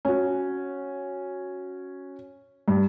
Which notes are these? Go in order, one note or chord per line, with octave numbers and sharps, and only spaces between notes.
C#4 F#4
G2